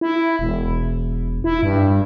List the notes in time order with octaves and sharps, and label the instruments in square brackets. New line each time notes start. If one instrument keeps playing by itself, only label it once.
[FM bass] E4
E1
E4
G2